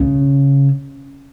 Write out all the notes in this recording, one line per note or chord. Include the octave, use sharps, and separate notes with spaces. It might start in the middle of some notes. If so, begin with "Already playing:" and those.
Already playing: C#3